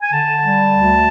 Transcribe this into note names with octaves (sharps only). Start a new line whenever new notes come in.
G#5
D3 A5
G3
D2